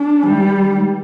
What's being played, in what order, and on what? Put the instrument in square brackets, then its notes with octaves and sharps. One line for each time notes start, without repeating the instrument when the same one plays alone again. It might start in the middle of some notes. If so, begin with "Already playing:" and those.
Already playing: [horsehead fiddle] D4
[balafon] D#3 G#3 D#4 [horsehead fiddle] G3
[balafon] D#3 G#3 D#4